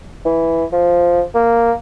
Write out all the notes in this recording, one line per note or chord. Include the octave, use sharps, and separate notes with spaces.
E3
F3
A#3